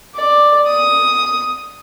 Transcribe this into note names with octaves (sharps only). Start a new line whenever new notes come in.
D5
D#6